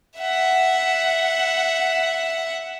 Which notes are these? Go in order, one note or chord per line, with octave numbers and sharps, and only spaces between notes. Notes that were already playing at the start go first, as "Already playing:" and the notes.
E5 F#5